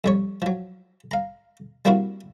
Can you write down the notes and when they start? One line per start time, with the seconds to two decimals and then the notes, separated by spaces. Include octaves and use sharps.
0.04 F2 G3 C#5
0.42 F3 F#3
1.11 F5 A#5
1.85 G3 A#3 C4 E4 F#4 F5